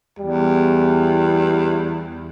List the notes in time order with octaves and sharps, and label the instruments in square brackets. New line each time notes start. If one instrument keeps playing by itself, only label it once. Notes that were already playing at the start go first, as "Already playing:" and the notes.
[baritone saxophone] E2 [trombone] G3